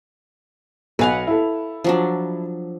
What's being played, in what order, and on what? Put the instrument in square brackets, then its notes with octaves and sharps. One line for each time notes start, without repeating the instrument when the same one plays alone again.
[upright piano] B1 G#5 F7 [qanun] B4 F5 F#5
[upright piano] E4 A4
[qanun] F3 F#3 D4